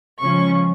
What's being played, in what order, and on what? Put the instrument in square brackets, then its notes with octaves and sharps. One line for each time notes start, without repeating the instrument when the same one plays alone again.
[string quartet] C#3 F3 G#3 C#4 F4 C#6